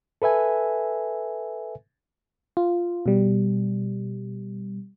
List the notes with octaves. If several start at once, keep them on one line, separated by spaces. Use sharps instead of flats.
A4 B4 E5 G#5
F4
B2 G3